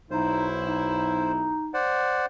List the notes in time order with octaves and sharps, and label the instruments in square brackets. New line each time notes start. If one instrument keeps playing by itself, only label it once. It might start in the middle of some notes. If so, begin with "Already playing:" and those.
[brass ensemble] B1 E4 [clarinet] D#4 [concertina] C5
[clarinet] D#4
[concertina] C5 D5 F#5